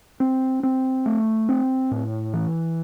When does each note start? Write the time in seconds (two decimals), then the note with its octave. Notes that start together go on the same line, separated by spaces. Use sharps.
0.20 C4
0.63 C4
1.06 A3
1.49 C4
1.91 A2
2.33 E3